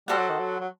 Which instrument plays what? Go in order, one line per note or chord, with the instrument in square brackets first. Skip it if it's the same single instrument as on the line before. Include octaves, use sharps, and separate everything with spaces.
[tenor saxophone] G3 [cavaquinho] F#4 A4 C5 F#5
[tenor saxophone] F#3
D#3
F#3
F#3